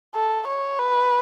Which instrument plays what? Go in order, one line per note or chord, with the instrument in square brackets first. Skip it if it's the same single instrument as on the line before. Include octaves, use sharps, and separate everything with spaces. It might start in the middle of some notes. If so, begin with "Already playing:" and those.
[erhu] A4
C#5
B4